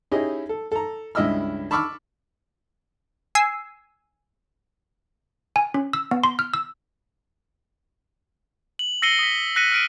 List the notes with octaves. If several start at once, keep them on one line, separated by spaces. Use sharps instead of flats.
C#4 D#4 E4 G4 G#4 D#5
A4
A4 A#5
C#2 G2 E4 D#5 E6 F6
A5 B5 C#6 D6 E6 F6
G#5 E6 C7
G#5
C#4
E6
B3
C6
F6
E6
F#7
E6 A#6 C7 C#7 D#7 G7
D#6 B6
F#6 A#6 B6 C#7 D#7
F6 D7 D#7